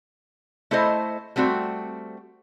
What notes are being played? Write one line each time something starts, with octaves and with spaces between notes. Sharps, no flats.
A3 E4 A4 C5 D#5
G3 A3 C4 F#4